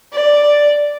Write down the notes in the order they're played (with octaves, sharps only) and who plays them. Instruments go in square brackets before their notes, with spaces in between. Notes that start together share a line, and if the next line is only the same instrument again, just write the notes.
[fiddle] D5